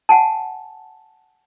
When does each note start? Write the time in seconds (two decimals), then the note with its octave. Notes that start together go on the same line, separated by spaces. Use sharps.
0.09 F#5 G#5 A5